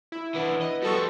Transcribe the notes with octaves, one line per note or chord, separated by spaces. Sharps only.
E4
E3 B3 D4
D#5
F3 G3 F#4 A4 C#6